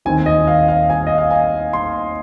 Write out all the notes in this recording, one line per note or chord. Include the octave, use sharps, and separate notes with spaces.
D#2 D#3 C4 G#5
D#5
F5
F5
G#5
D#5
F5
G#5
C6